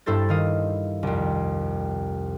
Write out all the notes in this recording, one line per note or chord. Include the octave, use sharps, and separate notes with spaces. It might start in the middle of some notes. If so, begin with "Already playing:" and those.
G2 E4 A4 C5 A6
D#3 F5 D#6
C2 F2